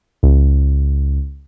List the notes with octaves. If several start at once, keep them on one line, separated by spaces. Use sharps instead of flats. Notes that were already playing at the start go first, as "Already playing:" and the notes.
C#2